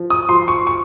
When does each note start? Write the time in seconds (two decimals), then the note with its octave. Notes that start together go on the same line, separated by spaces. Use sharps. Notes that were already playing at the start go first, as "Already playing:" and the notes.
Already playing: F3
0.10 D#6
0.29 F3 C6
0.48 C#6
0.67 C#6